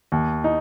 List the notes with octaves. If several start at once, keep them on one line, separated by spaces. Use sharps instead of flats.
D#2
D#4